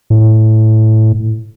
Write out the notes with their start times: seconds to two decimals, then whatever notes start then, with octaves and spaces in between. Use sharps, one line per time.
0.10 A2